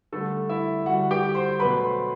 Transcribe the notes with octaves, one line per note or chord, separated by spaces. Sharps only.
D3 G3 A3 A4
E4 E5
D3 G3 F#4 F#5
G4 G5
C5 C6
B2 F#3 A3 B4 B5
C5 C6